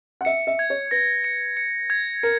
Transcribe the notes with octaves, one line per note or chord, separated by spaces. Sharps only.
F#5
E5 C#7
E5
G#6
C#5
B4 A#6
C#7
C#7
G#6
A#4 C#7